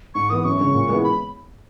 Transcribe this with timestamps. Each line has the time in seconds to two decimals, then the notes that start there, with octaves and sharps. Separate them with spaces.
0.15 G#2 C#6
0.30 E3 B3 D#6
0.45 F#2 C#6
0.60 C#3 G#3 C#4
0.74 A#2
0.89 G#3 B3 E4
1.04 B5